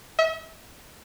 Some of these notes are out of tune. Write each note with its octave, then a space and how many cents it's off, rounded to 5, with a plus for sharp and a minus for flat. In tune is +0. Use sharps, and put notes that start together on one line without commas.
E5 -40